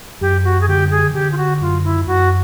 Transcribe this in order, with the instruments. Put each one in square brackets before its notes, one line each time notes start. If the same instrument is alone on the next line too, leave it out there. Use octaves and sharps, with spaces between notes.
[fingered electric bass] F#2 [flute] G4
[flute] F#4
G#4
[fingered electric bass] D3 [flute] G4
[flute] G#4
[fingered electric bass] D3 [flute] G4
[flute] F4
F#4
[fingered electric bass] F#2 [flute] F4
[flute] E4
[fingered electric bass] F#2 [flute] F#4